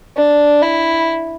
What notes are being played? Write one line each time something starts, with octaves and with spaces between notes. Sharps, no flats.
D4
E4